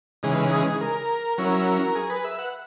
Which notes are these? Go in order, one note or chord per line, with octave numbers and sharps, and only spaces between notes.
C#3 E3 G#3 D#4 G#4
B4
G#4
A#4
F#3 C#4 E4 A#4
G#4
B4
E5
F#5